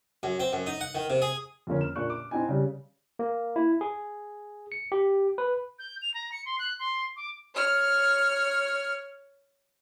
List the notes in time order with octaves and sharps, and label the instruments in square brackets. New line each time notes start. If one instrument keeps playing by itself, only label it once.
[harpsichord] F#2
C4
F#2
D#4
F#5
D#3
C3
G#4
[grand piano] F2 D3 A#3 C#4
F6 E7
A#2 A#3 D4 C#6 F#6
D6
C4 D#4 E4 G5 G#5
C#3 G3
[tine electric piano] A#3
E4
G#4
C#7
G4
B4
[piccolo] G6
F7
A#5
C#7
C6
F#6
C6
D6
[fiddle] C#5 F6